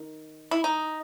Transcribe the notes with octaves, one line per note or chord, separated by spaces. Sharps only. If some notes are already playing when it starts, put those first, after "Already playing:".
Already playing: D#3
E4
D#4